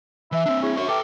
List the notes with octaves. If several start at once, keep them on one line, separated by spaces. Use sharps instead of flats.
E3 E5
C4 D4
E4 G#4 C#5
F#2 D4 E5 C#6
A4 B4 E5 G5 D6